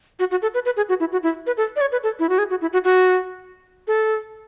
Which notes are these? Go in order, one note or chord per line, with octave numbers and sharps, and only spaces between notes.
F#4
F#4
A4
B4
B4
G#4
F#4
E4
F#4
E4
B4
A4
D5
C#5
B4
A4
E4
F#4
G#4
F#4
E4
F#4
F#4
A4